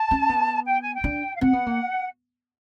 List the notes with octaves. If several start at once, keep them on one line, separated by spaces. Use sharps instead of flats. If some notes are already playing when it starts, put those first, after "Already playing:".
Already playing: A5
C#4
B3
G5
G#5
G5
D4
F5
C4 F#5
B3
A#3